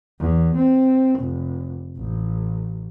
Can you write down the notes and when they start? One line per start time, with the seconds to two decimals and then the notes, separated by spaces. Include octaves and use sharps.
0.20 E2
0.56 C4
1.19 F1
1.97 A1